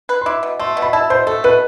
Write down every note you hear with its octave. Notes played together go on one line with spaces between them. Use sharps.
B4
C6
E4 D6
B2
A3 C6
B2
B5
E4 A5
B2 C5
A3 A4
B2 B4